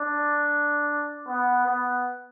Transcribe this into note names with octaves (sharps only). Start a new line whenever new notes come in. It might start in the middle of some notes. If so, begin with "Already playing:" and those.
Already playing: D4
B3
B3